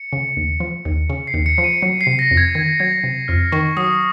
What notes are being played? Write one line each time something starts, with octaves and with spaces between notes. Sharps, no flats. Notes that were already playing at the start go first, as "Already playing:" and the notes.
Already playing: C#7
C#3
D#2
F3
D#2
C#3
C7
D#2
C#7
F3
D#7
F#3 C#7
C7
C3
A#6
F2
G#6
D#3 G#6
F#3 G#6
C3
F2 F6
D#3 C#6
F#3 D#6